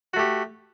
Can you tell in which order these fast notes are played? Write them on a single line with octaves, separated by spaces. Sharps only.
F#4 A3 G4